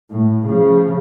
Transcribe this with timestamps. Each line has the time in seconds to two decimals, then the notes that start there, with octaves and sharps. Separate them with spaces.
0.11 A2
0.46 C#3 F3